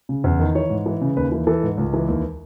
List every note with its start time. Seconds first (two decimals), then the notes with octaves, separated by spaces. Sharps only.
0.09 C#3
0.24 E2
0.40 D#3
0.55 E3 C#5
0.70 G#2
0.86 E3
1.01 C#3
1.17 D#2 B4
1.32 E3
1.47 E3 A4
1.63 G#2
1.77 C#2
1.94 E3
2.08 D#2